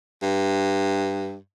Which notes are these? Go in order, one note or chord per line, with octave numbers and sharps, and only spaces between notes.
G2